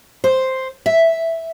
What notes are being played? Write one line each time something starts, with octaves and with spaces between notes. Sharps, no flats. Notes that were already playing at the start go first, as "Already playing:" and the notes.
C5
E5